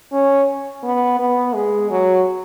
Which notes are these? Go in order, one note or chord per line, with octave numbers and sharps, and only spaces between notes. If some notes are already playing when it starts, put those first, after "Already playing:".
C#4
B3
B3
G#3
F#3